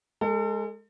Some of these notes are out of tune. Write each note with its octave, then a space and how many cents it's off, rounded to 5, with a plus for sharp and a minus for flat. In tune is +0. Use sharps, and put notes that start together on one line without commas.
G#3 +0 A4 +40